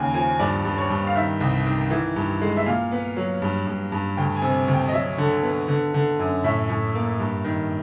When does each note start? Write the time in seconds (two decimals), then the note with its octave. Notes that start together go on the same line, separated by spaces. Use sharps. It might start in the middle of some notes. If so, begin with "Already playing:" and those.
Already playing: D#2 C#3 G5 G#5
0.14 F3 G#5
0.40 G2 D5
0.65 G2
0.78 C#5
0.90 G2
1.07 F5
1.15 D#3 E5
1.41 C2
1.66 D#3
1.91 E3
2.16 G2
2.42 G#3
2.56 E5
2.66 A#2 F5
2.91 B3
3.17 F#3
3.42 G2
3.67 G2
3.92 G2
4.17 D2 G5
4.36 G#5
4.42 C3
4.68 D2
4.74 G5
4.88 D#5
4.93 F#3 E5
5.18 D3
5.43 B3
5.68 D3
5.94 D3
6.19 F#2
6.44 A2 E5
6.69 A2
6.95 A#3
7.20 G2
7.44 D#3